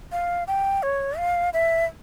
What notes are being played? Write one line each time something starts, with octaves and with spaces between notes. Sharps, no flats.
F5
G5
C#5
F5
E5